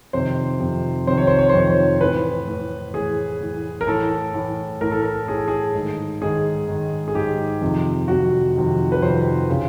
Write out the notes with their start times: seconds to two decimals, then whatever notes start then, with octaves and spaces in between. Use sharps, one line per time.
0.13 F2 C3 D#3 C5
0.60 F2 C3 D#3
1.07 F2 C3 D#3 C5
1.18 C#5
1.27 C5
1.39 C#5
1.49 F2 C3 D#3 C5
1.60 C#5
1.70 C5
2.01 A2 E3 B4
2.48 A2 E3
2.94 A2 E3 G#4
3.41 A2 E3
3.81 A#4
3.87 A2 E3 A4
4.34 A2 E3
4.81 A2 E3 A#4
4.91 A4
5.02 A#4
5.28 A2 E3 G#4
5.38 A4
5.48 G#4
5.74 G#2 D#3
6.21 G#2 D#3 G#4
6.68 G#2 D#3
7.08 G#4
7.14 G#2 D#3 G4
7.61 F2 C3 D#3
8.08 F2 C3 D#3 F#4
8.55 F2 C3 D#3
8.92 B4
9.02 F2 C3 D#3 C5
9.50 C#3 E3